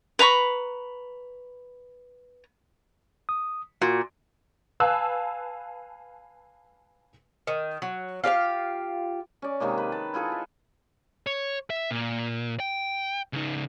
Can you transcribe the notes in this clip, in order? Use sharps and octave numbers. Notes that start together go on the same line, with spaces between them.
B4 A#5 B5 C#6
D#6
A#2 F#4
B4 F5 G#5 A5 E6 F#6
D#3
F#3
F4 G4 C#5 F5
C#4 D5
C3 D#3 G#3 A#3
B4
A5
E4 F4 G#4 A4
E5
C#5
E5
A#2
G5
C#3 D#4